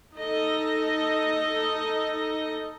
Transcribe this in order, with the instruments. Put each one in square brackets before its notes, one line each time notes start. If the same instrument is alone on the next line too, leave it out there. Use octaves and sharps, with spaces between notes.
[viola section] D#4 A4 D#5